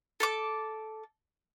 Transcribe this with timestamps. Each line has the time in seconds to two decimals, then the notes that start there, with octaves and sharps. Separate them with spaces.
0.20 A4 A5 D6